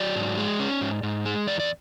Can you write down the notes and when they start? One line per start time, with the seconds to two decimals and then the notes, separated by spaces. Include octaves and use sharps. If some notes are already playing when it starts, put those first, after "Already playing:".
Already playing: F#3 D5
0.16 G#2
0.37 G#3
0.60 C#4
0.81 G#2
1.03 G#2
1.25 G#3
1.47 E2 D5
1.60 D5